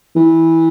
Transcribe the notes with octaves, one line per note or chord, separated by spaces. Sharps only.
E3